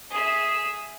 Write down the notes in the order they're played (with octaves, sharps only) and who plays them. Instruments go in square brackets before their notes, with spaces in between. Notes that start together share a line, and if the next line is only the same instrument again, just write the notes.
[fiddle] G#4 E5